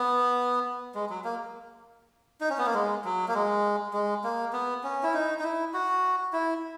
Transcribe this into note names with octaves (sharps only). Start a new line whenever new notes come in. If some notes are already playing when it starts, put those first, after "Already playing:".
Already playing: B3
G#3
F#3
A#3
D#4
C#4
B3
A#3
G#3
F#3
A#3
G#3
G#3
A#3
B3
C#4
E4
D#4
D#4
E4
F#4
E4